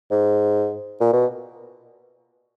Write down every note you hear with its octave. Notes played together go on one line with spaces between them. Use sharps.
G#2
A#2
B2